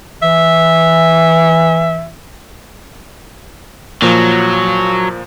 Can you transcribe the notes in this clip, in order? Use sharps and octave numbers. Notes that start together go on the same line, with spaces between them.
E3 E5
A#2 F3 F#3